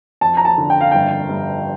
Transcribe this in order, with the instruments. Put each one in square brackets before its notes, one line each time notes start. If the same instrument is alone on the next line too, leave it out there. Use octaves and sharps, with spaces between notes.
[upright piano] F2 [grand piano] A5
[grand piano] A#5
A5
[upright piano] D3
[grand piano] G5
F5
[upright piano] G1 [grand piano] G5
[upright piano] G2